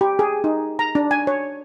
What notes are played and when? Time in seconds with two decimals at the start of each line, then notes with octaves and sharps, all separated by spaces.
0.01 G4
0.19 G#4
0.44 D#4
0.79 A#5
0.95 D4
1.11 G#5
1.27 C#5